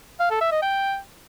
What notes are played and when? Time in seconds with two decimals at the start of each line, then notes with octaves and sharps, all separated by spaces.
0.20 F5
0.30 A4
0.41 E5
0.52 D#5
0.62 G5